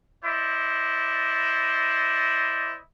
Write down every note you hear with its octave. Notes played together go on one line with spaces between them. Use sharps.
E4 C5 D5 D#5